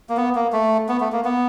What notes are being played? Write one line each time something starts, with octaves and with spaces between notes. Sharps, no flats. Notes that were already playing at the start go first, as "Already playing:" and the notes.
A#3
B3
A#3
A3
B3
A3
A#3
B3